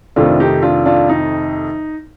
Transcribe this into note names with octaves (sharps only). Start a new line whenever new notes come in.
F2 C3 D#3 A3 D4 F4
D#4 G4
D4 F4
D4 F4
D#4